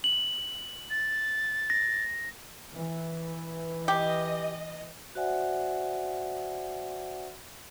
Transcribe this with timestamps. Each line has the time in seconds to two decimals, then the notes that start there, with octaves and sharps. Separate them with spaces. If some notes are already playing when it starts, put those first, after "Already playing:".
0.04 F#7
0.90 A6
1.70 A#6
2.76 E3
3.88 G4 D#5
5.15 F#4 C5 D5 E5 F#5 G#5